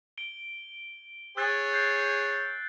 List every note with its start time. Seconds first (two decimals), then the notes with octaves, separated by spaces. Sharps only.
0.18 D7 G7
1.37 G#4 C#5 E6 F#6 A6
1.73 G6 C7